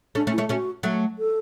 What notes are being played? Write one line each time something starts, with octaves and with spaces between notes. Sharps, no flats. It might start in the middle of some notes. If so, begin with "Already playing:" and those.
A3 C#4 D4
A3 C#4
E4
A3 C#4
A3 C#4 F#4
F#3 A3
A4